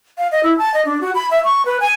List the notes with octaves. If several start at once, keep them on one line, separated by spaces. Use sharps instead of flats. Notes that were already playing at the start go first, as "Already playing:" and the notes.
F5
D#5
E4
A5
D#5
D4
F#4
B5
E5
C#6
B4
G#5